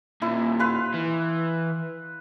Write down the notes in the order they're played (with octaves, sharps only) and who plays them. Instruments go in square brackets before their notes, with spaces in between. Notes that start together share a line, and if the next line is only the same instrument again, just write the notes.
[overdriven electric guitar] D#2 A#2 [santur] E4
[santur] B4 F5 C6
[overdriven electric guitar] E3